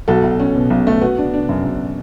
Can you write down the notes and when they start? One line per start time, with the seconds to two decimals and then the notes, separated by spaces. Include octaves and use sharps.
0.08 B1 F#4 A4
0.23 B1
0.40 C#4
0.56 B2
0.70 B1
0.87 A3
1.02 B3 F#4
1.18 D4
1.34 D4
1.49 F#2
1.65 F#2